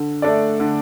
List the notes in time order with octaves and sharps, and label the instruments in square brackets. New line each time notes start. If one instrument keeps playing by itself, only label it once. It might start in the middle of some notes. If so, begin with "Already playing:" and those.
Already playing: [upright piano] D3
A3 D4 A4 D5
D3